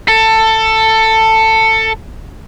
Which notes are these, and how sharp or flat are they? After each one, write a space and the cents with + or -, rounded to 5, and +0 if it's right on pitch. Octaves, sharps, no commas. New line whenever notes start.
A4 +15